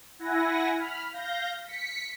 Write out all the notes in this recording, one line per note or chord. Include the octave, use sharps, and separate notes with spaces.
E4 F#5 G#5 A#6
B5 F6
F5 G6 A#6
B6 C#7